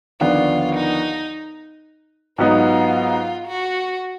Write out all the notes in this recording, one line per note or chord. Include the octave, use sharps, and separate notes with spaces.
D#2 D3 F3 B3 D4 F4
D#4
G#2 F#3 B3 D#4 F4
F#4